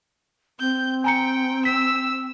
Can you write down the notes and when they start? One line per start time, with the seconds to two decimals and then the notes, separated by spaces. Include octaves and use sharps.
0.60 C4 G6
1.04 G5 G#5 A#5 C#7
1.65 E6 B6